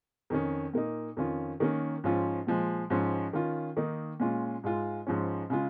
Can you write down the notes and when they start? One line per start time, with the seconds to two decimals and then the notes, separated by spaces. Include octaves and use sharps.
0.30 F2 D#3 C#4
0.74 A#2 A#3 D#4
1.17 F2 D#3 C#4 F4
1.60 D#3 A#3 C#4
2.04 G#2 F3 C#4 F4
2.47 A#2 F3 G#3
2.90 G#2 F3 C#4
3.33 D#3 C#4 F4
3.77 D#3 A#3 D#4
4.20 A#2 G#3 C#4 F4
4.64 G#2 G#3 F4
5.07 G#2 F3 C#4
5.50 C#3 G#3 F4